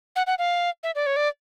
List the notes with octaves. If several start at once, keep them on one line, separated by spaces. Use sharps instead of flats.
F#5
F#5
F5
E5
D5
C#5
D5